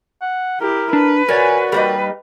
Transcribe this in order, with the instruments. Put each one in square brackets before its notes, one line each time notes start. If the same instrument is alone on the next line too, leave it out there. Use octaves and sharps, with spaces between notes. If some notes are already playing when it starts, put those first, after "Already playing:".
[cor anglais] F#5
[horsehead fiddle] E4 G4 [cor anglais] A#4
[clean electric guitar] D4 [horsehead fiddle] B4
[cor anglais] F#4 [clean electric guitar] A#4 C#5 D5 [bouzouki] G#5
[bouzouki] G3 A#3 D#4 [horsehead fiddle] B4